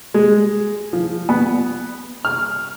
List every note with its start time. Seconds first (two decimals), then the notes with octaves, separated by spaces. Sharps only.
0.14 G#3
0.93 F3
1.29 B3
2.25 F6